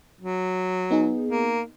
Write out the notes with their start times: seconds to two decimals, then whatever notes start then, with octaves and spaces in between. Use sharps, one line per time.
0.21 F#3
0.91 B3 D#4 G#4
1.29 A#3